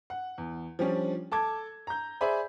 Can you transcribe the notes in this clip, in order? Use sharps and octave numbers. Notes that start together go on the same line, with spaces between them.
F#5
E2
F3 G3 C#4 D4
A4 A5 D6 G#6
A#5 G6
G#4 C5 D5 E5 G#5 B5